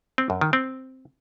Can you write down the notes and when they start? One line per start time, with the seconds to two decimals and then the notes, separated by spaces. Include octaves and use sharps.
0.18 C4
0.30 F#2
0.41 D#3
0.53 C4